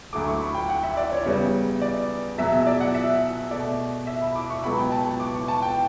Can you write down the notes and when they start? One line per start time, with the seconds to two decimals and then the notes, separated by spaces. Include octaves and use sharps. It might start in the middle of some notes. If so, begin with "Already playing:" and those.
0.13 D2 D3 F#3 A3 D6
0.27 C#6
0.41 B5
0.54 G5
0.69 F#5
0.83 E5
0.97 D5
1.12 C#5
1.25 E2 C#3 G3 B3 C#5
1.82 D5
2.38 E2 B2 F#3 E5
2.52 E5
2.67 D5
2.81 F#5
2.94 E5
3.51 B2 A3 D5
4.07 E5
4.22 B5
4.36 D6
4.50 C#6
4.63 C#2 B2 F#3 B3 B5
4.78 G5
4.92 A5
5.06 C#6
5.20 D6
5.34 C#6
5.48 A5
5.62 G5